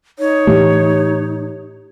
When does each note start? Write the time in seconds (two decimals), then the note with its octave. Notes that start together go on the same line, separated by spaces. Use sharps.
0.19 D#4 C#5
0.47 A2 E3 A3 G4